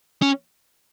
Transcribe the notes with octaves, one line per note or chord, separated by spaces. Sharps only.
C#4